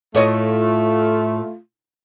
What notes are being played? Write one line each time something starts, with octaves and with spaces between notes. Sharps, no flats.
A2 A3 F4 C#5 D#5